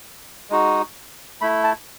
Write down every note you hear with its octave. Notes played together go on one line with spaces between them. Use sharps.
G#3 D#4 F#4
A3 E4 B5
A5